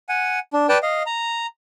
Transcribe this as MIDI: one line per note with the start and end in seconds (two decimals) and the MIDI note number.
0.09 0.39 78
0.09 0.39 80
0.53 0.67 62
0.69 0.78 71
0.69 0.78 74
0.69 0.78 79
0.69 0.78 81
0.83 1.03 75
0.83 1.03 77
1.06 1.46 82